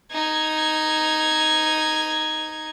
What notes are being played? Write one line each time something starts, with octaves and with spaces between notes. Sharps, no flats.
D#4 G#6